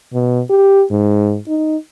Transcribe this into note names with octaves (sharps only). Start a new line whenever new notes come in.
B2
G4
G#2
D#4